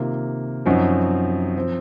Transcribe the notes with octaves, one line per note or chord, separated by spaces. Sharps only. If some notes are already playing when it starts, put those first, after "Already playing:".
Already playing: C3 D#3 A#3 F4
F#2 F3 C4 D#4 F#4
F3 C4